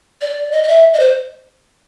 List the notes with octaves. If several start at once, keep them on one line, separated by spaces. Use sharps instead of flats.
D5
D#5
D#5
E5
D#5
C5